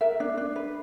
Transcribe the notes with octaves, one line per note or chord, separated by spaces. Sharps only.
A#4 E5
D4
D4
B4